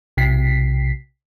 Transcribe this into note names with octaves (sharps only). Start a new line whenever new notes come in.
B1 C3 B6 C7